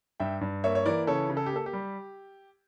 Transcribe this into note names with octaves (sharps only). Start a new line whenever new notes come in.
G2 E5 G5
G2
A#3 C#5 E5
C#5
E3 A#4 D5
C#3 A4 C#5
C#3
A4
G4
A#3 A4
G4
G3